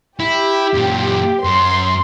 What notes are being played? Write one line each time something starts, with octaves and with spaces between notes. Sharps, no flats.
E4 G4
F#2 A#2
F#2 C6